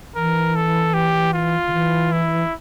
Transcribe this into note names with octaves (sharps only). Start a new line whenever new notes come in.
E3 A#4
A4
G4
F4
D3
E3
E4